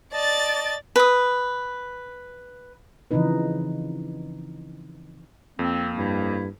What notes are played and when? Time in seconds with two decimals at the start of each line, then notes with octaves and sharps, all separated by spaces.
0.13 D5 D#5 A5 A6
0.96 B4 D#6
3.11 C#3 E3 F3 C4 D#4 B4
5.59 F2 A#3 C4
5.98 G2 E4